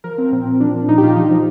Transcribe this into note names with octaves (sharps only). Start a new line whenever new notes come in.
F3 A#4
F3 C4
A#2 C4
A#2
F3 D4
F3
A#2 D#4
G4
A#2 F4
F3 D#4
F3